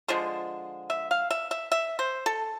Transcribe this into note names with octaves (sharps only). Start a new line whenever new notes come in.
D3 F3 G#3 C5
E5
F5
E5
E5
E5
C5
A4